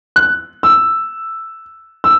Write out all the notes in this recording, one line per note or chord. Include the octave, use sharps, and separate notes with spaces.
F#6
E6
E6